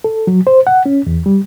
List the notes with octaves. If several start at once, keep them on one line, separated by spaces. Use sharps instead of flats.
A4
F#3
C5
F#5
C#4
E2
G3